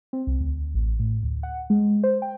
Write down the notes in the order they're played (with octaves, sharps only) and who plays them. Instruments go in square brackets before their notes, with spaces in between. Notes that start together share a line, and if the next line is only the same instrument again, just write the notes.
[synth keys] C4
C2
D2
A1
A2
D2
F#5
G#3
C5
G5